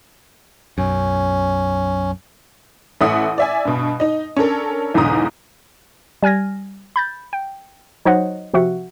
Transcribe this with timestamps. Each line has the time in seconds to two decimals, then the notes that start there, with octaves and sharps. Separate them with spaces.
0.78 B1 F#2 C#4
3.01 A1 A3 E5 F#5 D#6
3.38 D5 E5 G#5
3.65 G2 B2
4.00 D#4 D#5
4.36 C#4 D4 A4 A#4
4.94 B1 E2 G#2 D3 A#5 D#6
6.23 G3 G#5 F6 G#6 A#6
6.96 B5 G6 A6
7.33 G5
8.05 F#3 D#4 C5 C#5 D#5 F#5
8.54 C3 F3 C4 F#4 E5 F#5